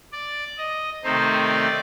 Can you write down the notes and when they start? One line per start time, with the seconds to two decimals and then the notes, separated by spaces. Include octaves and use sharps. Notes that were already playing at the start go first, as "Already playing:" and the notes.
0.12 D5
0.58 D#5
1.03 C3 D#3 A3 C4 D#4 C5
1.49 D5